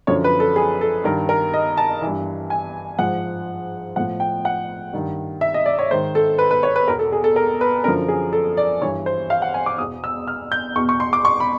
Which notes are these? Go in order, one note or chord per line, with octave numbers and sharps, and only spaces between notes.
F#2 D3 F3 C#5
B4
A4
G#4
A4
G2 D#3 A#4
A#4
D#5
A5
E3
G2
G#5
G#2 F3 F#5
A2 F3 F#5
G5
F#5
G2 D#3
E5
D#5
D5
C#5
G#2 D#3 C5
A4
B4
B4
C#5
B4
E2 B2 A#4
A4
G#4
A4
A#4
B4
F#2 D3 F3 A#4
G#4
A4
D5
G2 E3 C#5
C5
F5
F#5
G#5
D6
E2 B2 D#6
E6
F6
G6
E2 B2 C#6
C#6
C6
D6
C#6
B5